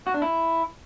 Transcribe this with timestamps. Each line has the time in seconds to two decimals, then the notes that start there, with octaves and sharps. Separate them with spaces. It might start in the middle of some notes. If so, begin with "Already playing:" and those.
0.07 F#4
0.14 D4
0.22 E4